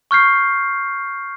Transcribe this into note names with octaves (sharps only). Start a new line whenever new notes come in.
C#6 F6 G6 C7